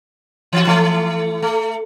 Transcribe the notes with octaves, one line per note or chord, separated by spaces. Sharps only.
E3 F#4
E3 A3
A3